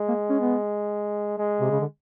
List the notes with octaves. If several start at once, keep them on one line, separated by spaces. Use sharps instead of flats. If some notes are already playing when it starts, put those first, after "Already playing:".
Already playing: G#3
A#3
C#4
B3
G#3
C3
C#3
D3